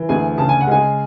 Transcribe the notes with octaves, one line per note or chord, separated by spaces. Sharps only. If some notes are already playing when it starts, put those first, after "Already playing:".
Already playing: E3
D2 G#4 G#5
C#3 A5
G#5
F#5
G#3 G#4 G#5